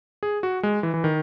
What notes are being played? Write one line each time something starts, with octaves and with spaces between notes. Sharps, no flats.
G#4
F#4
G#3
E3
E3
D#3